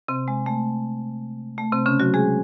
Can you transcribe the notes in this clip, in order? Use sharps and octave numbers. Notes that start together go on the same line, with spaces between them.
C3 C4
G#3
A3
A3
C3 C4
C#3 C#4
F#3 F#4
G#3 G#4